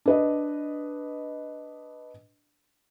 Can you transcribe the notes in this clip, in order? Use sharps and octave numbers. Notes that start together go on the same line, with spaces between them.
D4 B4 D#5